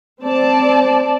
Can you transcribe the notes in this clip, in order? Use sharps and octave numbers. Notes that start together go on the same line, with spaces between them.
C4 D5 A5